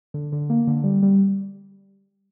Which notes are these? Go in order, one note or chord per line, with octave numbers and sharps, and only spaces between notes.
D3
D3
A#3
D3
G3
G3